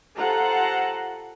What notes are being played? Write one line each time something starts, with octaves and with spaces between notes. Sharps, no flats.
F4 G4 A4 C5 F#5 A#5